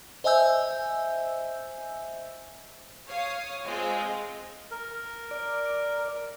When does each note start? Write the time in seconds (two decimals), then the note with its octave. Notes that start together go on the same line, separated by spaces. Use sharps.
0.24 C5 D#5 E5 G#5 E6 G6
3.08 C#5 F5 D#6
3.64 G#3 C4 F4
4.71 A#4
5.31 D5